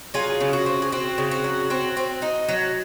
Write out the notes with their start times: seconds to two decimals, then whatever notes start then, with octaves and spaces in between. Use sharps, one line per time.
0.14 F#3 F4 G#4
0.41 C#3
0.53 F#4
0.66 C4
0.82 G#4
0.92 C4 F#4
1.18 C#3
1.31 F#4
1.44 F#3
1.70 C4 F#4
1.97 C4
2.22 D#4
2.49 F#3